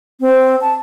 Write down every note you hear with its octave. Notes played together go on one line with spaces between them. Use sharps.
C4
A5